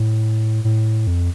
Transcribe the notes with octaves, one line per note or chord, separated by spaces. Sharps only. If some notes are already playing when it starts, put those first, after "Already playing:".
Already playing: A2
A2
F2